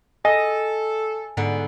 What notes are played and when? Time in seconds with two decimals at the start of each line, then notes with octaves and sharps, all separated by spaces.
0.25 A4 D#5 G#5
1.37 G#2 D3 B3